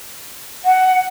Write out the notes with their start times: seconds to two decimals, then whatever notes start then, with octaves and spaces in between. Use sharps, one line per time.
0.65 F#5